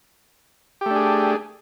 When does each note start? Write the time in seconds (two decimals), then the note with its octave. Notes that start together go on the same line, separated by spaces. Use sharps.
0.81 G4
0.86 A3
0.91 D4
0.95 G#4